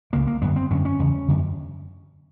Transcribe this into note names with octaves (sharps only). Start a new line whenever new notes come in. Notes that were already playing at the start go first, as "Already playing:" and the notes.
C#2 C#3 A#3
A#3
F#2 D3 B3
C4
F#2 D3 C#4
C#4
E2 C#3
F#2 D3